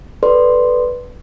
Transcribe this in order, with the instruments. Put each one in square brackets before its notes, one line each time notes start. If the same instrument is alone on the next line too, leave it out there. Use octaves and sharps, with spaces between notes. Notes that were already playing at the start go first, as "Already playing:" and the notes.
[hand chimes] A4 B4 D5 C6